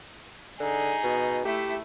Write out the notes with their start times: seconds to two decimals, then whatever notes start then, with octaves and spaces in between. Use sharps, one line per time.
0.60 D3 D#4 G#4
1.03 B2
1.45 A3 E4 G4